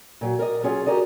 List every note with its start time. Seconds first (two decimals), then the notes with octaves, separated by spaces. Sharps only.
0.21 A#2 F#3
0.39 A#4 D5 D#5
0.63 F#3 C#4 F4 G#4
0.86 F#4 G4 A#4 D5 D#5